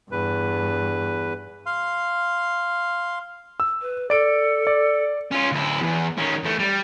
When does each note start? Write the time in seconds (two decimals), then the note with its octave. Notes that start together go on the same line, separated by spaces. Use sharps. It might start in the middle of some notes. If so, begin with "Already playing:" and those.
0.11 E2 G2 B4
1.66 F5 C6
3.60 E6
3.82 B4
4.10 A4 D5 D7
4.67 D5
5.31 C#4 F4
5.52 D2 E4
5.82 E2
6.18 D#3 C#4
6.44 E2 A3
6.59 G3